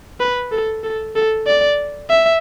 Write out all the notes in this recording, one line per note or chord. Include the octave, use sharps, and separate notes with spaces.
B4
A4
A4
A4
D5
E5